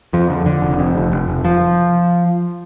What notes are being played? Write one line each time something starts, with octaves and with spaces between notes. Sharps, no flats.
F2 F3
D3
D3
F1
F2
F1
F1
F1
F3